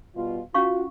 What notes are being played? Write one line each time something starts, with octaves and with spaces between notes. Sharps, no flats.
B2 G3 F4
C#4 F4 F#4 F5 C#6